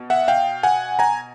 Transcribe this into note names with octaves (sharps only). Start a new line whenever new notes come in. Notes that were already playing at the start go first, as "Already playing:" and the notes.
Already playing: B2
E5 F#5
F5 G5
F#5 G#5
G#5 A#5